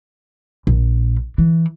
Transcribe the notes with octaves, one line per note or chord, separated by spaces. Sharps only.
A#1
E3